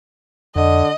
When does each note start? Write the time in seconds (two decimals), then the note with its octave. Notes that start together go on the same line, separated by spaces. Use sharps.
0.56 F2 D3 D#5